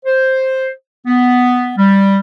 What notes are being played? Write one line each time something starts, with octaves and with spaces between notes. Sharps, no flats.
C5
B3
G3